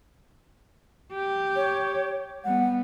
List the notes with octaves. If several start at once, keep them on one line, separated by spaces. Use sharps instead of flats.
G4
C#5
G3 B3 F#5